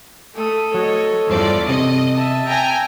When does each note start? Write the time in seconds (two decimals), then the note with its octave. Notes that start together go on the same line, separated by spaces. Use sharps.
0.35 A3 A4 D#6
0.74 F#3 C#5 D#5
1.30 E2 G2 C#4 F4 C5 D5
1.68 C3 D#5 D#6
2.15 E5 A5
2.46 G5 G#5 A#5